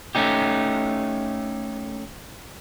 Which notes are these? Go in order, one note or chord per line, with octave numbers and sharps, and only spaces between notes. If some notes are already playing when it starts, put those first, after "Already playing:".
A3 C#4 D#4 G4